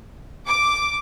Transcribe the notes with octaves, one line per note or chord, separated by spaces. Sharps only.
D6